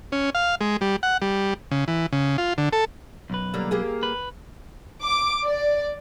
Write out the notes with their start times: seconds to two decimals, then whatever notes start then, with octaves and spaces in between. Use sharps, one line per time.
0.12 C#4
0.35 F5
0.61 G#3
0.81 G3
1.03 F#5
1.22 G3
1.71 C#3
1.88 E3
2.13 C#3
2.38 F4
2.58 D3
2.73 A4
3.30 B1 F#2 B4
3.54 D3 G3 A#3
3.71 A#3 G4 G#4
4.03 B4
5.02 D6
5.45 D5